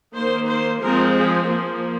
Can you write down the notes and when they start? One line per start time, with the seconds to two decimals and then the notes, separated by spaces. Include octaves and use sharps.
0.15 D#3 A#3 C5
0.48 C5
0.81 F3 G#3 C4 A#4
1.15 G#4
1.47 F3 A#3